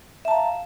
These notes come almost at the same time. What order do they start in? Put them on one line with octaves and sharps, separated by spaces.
E5 A5 A#5 F5